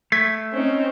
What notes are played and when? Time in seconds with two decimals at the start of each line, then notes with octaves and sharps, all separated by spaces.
0.12 A3 G#6 B6
0.54 C4 C#4 D#4